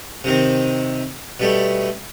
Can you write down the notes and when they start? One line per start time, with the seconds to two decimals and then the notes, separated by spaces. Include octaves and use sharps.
0.24 C3 D#3 C4
1.40 B2 G3 A3